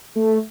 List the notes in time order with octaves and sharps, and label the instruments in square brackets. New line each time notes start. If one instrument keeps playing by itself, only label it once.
[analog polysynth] A3